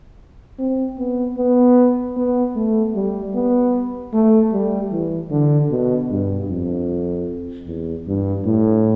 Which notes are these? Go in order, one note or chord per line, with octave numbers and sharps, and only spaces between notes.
C4
B3
B3
B3
A3
G3
B3
A3
G3
E3
D3
B2
G2
F2
E2
G2
A2